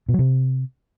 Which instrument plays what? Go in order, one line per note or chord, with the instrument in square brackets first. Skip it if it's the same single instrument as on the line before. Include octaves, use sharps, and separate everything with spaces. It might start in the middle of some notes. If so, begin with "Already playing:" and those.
[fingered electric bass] B2
F#3
C3